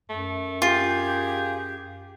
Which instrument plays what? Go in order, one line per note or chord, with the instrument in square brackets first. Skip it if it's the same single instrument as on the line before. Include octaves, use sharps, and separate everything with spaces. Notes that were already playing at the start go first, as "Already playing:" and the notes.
[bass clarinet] F#2 [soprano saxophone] A3
[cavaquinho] F4 [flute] G4 [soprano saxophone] G#4